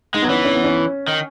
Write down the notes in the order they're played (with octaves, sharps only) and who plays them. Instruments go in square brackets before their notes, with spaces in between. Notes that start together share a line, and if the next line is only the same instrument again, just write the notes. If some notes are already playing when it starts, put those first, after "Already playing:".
[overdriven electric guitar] G#3 [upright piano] D#4
[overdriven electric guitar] F#3 [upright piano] B3
[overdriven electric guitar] E3 [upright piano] C#4
[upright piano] C#4
B3
C#4
[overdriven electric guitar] D#3